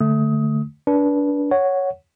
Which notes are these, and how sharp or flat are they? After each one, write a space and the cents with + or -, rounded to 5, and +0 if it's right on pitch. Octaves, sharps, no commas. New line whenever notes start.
D3 +0 A3 +0 D#6 +20
D4 -25 B4 -25
C#5 +0 F#5 +0